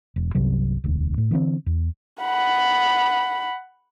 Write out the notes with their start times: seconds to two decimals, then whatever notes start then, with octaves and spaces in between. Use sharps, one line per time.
0.16 E1
0.35 G1 C2 C3 F#3
0.84 E1 D2
1.18 A2
1.31 D3 E3 A#3 C4
1.66 E2
2.22 F#5 B5